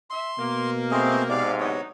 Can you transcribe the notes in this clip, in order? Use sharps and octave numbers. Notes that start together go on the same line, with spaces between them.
E5 C6
B2 A#3
A3 C4 G#4 D#5
G#2 C3 D5 F5
D3 F#3 B3 D#4 C#5